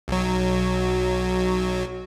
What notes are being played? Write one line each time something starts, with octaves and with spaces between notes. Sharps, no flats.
B1 F#3